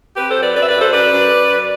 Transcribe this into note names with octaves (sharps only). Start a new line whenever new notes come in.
C4 G4 B4
A4 C5
F#3
B4 D5
F#2 B4 D5
E5
B4 D5
F#2
A4 C5
F#2 B4 D5
F#2
F#2
F#2